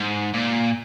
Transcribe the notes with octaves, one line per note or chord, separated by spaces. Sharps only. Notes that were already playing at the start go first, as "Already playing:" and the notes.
Already playing: G#2
A#2